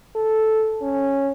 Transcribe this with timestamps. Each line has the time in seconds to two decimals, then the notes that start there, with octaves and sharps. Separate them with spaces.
0.15 A4
0.82 C#4